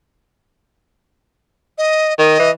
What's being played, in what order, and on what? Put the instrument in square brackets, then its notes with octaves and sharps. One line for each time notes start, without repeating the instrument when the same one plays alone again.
[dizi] D#5
[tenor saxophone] D#3 [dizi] D#5
[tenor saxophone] E3